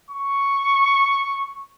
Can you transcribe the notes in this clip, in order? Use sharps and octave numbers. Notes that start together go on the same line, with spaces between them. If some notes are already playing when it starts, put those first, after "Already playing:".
C#6